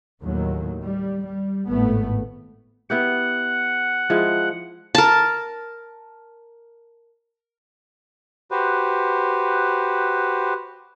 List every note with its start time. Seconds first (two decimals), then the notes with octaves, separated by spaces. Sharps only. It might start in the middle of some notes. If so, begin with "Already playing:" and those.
0.21 D#2 A2 D#3 F#3
0.83 G3
1.24 G3
1.68 G#1 A2 A3 B3
2.90 B3 E4 G4 F#5
4.10 F3 G#3 E4
4.95 A#4 A5
8.51 F#4 G4 B4 C5